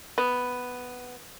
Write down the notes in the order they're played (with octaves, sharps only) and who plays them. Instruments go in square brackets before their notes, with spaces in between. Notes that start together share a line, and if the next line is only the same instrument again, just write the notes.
[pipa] B3